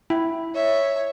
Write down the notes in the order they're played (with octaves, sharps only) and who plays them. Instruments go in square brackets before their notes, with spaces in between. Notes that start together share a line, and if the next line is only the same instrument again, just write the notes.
[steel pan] E4
[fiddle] C#5 E5